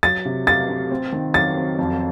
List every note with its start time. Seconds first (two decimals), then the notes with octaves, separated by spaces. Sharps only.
0.03 F#3 A6
0.25 C3
0.46 C3 A6
0.69 C3
0.91 C4
1.12 D#3
1.34 F#3 A6
1.56 C4
1.78 F2